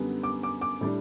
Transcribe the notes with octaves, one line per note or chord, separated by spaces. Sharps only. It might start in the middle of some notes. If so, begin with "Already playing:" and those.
Already playing: F#2 D3 G3 B3
D6
D6
D6
A2 G3 D4